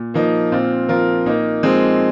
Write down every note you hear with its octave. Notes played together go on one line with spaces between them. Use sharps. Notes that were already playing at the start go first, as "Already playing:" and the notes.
Already playing: A#2
F3 A#3 D#4
A#2 C4 F4
F3 F4 A#4
A#2 A#3 D#4
F3 G#3 C4